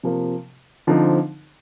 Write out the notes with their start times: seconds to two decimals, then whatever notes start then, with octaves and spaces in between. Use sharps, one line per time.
0.03 C3 F3 A#3
0.87 D3 F3 C4 D#4